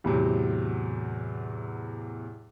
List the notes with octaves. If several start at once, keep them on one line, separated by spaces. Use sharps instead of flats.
E2 A2 C3 F#3